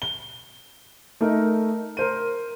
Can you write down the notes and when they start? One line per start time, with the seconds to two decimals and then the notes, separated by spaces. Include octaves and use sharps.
0.02 G7
1.21 A3 D#4 A#4
1.97 A#4 C5 D#7